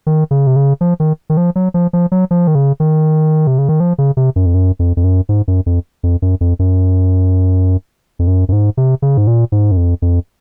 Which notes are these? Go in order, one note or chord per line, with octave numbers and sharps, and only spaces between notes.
D#3
C#3
C3
C#3
F3
D#3
D#3
F3
F#3
F3
F3
F#3
F3
D#3
C#3
D#3
C3
C#3
D#3
F3
C#3
C3
F#2
F2
F#2
F2
F2
F#2
G#2
F#2
F2
F2
F#2
F2
F#2
F2
F#2
F#2
G#2
C3
C#3
G#2
A#2
G#2
F#2
F2
F2